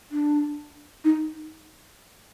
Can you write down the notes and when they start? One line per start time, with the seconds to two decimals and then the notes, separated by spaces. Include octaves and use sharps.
0.11 D4
1.05 D#4